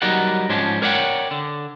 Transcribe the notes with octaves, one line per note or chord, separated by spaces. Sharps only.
F#3 G3 D#4 A#4 D5 F#5
G#2 F3 C#4 D4
A#4 C#5 D5 E5 F#5 G5
D3